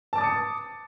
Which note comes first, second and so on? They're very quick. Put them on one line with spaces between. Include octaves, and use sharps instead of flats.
A5 D6 A6 D#6 C#7